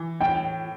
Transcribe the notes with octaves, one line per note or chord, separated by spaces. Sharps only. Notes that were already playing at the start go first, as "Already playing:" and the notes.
Already playing: E3
A2 G5